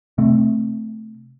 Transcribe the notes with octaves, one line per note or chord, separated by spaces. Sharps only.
C3 A3 C4